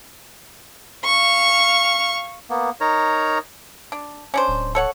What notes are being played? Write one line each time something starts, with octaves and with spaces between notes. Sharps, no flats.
F5 C#6
A#3 B3
D#4 A#4 C#5 A#5
D4
C#4 D4 C5
D1
A4 C#5 F#5